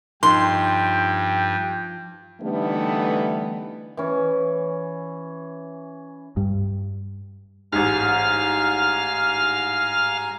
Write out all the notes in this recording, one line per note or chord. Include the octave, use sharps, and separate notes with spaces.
G2 F3 D#4 G5 C6
D3 E3 G3 A3 B3 D#4
E3 C#4
G2
A1 G#2 F5 G#5 A#5 F6